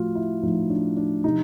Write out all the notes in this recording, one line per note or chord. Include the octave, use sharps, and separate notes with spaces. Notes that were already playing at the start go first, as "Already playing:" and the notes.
Already playing: A2 F3 F4 F#4
E4
A2 F3 D#4
D4
D4
C3 F3 D#4